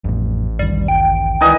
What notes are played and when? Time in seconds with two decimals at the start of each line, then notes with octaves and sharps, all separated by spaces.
0.04 A1 F2 A2
0.59 G1 D#2 G3
0.88 G5
1.41 C#2 D#3 E3 D#5